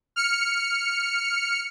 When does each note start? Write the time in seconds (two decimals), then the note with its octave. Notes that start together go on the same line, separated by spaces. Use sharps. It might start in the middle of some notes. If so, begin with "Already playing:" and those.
0.16 F6 C#7